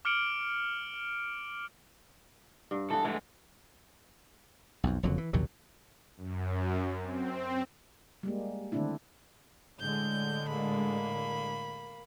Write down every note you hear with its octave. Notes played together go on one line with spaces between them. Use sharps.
D6 F6 C#7 D7 F#7
G2
E3 B3 A4
E3 G#3 A3
B1 F2
F#1 F2 D3 F#3
E3
A#1 D#2 C3 F#3
F#2
C4
G3 G#3 A#3
D3 D#3 A3 C4 D4 E4
A2 D3 G#3 G6
A#3 B5